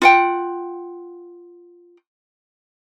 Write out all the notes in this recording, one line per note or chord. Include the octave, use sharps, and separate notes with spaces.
F4 F#5 G5